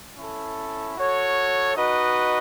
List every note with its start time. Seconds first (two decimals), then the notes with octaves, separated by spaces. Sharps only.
0.16 C#4 E4 A4
0.96 F#4 A4 C#5
1.76 D#4 F#4 B4 D#5